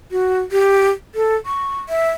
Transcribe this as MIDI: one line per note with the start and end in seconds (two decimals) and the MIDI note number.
0.11 0.39 66
0.52 0.90 67
1.15 1.35 69
1.46 1.79 85
1.89 2.10 76